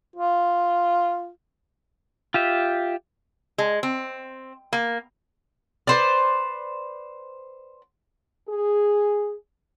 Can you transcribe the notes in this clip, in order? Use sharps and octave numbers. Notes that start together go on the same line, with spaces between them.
F4
F4 G4 E5
G#3
C4
A#3
B4 C5 D5
G#4